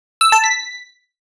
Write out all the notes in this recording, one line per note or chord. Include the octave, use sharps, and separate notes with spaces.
E6
A5
B6